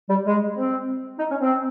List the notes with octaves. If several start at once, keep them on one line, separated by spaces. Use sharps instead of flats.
G3
G#3
C4
D#4
C#4
C4